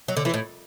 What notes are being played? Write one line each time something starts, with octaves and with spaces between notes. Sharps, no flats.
F#3
D3
E3
A2